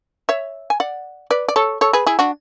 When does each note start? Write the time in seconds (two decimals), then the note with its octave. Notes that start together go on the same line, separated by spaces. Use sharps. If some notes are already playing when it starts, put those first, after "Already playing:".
0.29 C#5 E5
0.70 G#5
0.80 D5 F#5
1.31 B4 D5
1.48 D5
1.56 A4 C#5
1.81 A4 C#5
1.93 G#4 B4
2.06 E4 G#4
2.19 D4 F#4